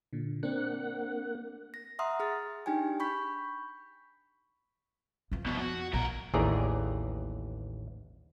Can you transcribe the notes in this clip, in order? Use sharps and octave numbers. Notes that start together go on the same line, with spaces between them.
A#2 D3
A#3 C4 D4 F#5
A#6
E5 F#5 A#5 C6 D#6 F6
G#4 F6 A6
D4 D#4 G4 G5 G#5
B5 C#6 G6 B6
F2 F3
C2 B2
F#4
A#1 B2 A#4
A1 D#2 E3 G#4 D5 A#5